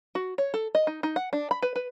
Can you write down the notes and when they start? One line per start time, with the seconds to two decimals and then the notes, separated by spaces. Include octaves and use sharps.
0.15 F#4
0.38 C#5
0.54 A4
0.75 D#5
0.87 D#4
1.03 D#4
1.16 F#5
1.33 D4
1.51 B5
1.62 B4
1.76 B4